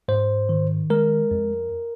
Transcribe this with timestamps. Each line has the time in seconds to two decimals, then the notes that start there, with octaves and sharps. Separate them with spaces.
0.08 G#2 C5
0.49 D#3
0.90 G#3 A#4
1.31 F2